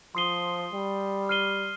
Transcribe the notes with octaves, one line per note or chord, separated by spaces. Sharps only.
F3 C6 D#6 C7 D#7 G7
G3
F6 C7 D#7 G7